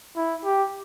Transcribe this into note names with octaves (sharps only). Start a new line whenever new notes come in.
E4
G4